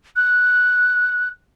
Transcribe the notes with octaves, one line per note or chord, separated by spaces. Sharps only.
F#6